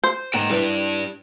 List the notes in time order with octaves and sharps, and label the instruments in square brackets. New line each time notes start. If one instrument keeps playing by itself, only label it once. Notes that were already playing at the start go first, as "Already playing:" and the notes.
[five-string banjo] C5
[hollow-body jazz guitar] G#2 A#3 F#5 [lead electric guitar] G5 A#5
[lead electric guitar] G2 D4 [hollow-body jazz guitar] G3 E4 B4